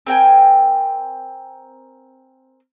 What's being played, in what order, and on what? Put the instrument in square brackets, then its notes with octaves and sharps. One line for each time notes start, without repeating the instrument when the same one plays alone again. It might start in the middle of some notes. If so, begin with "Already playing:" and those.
[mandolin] C4 A#4 G5 G#5